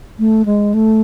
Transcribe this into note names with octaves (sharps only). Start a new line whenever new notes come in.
A3
G#3
A3